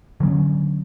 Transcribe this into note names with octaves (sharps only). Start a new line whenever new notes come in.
D3 F#3 C4 C#4